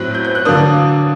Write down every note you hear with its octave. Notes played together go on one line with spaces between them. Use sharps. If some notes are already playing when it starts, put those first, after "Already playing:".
Already playing: A2 F#3 C4 F#6
G6
G6
F#6
D3 F#3 A#3 D4 D#6